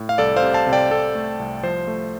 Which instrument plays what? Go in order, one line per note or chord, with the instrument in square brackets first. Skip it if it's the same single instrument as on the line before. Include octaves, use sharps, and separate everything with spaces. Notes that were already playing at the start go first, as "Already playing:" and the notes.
Already playing: [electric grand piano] A2
F5
C2 A4 D5
C5 F5
C3
F5 A5
C3
D5 G5
C3 A4
A3
C2
F3 C5
A3